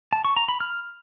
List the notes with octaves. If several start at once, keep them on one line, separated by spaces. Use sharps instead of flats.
A5
C#6
A#5
B5
F6